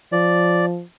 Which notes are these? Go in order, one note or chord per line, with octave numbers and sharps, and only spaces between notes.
F3 D5